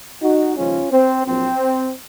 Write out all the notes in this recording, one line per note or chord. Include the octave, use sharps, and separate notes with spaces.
D#4 F#4
D#2 C#3 F3 G#3 C#4 F4
C4
A#1 A#2 F#3 C4